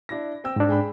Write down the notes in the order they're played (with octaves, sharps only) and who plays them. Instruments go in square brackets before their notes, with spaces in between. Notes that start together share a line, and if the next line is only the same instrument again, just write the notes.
[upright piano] D4 E4 A#6
C4 G5 E6
[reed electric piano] G#2 D4
[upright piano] G#4 G5 B5